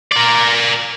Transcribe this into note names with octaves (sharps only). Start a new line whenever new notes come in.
A#4 D5